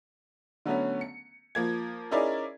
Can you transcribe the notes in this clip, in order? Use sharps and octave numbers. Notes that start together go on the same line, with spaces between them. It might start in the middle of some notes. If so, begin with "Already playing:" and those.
D3 F#3 A3 B3 C#4
C#7
F3 A#3 G#6
C#4 D#4 E4 G#4 A#4 D5